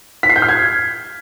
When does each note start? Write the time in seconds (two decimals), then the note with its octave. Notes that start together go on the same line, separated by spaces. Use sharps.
0.23 B6
0.30 C7
0.36 G6
0.42 F6
0.49 G#6